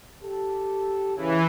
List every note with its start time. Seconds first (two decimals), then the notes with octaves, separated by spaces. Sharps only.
0.23 G4 A4
1.17 C#3 E3